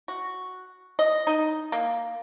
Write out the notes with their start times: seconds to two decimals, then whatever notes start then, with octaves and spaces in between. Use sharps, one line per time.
0.08 F#4
0.99 D#5
1.27 D#4
1.72 A#3